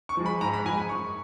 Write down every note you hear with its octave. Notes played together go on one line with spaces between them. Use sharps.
C#6
F3 G#3
B5
G#2 A#5
B5
F3 G#3 G#5
B5
F#2 C#6